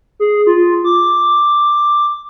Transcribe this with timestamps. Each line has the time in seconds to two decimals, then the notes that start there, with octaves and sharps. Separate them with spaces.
0.20 G#4
0.47 F4
0.84 D6